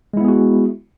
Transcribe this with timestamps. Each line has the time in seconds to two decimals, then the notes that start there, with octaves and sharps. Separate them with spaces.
0.13 G#3
0.17 E4
0.21 B3
0.25 G#4
0.28 F#4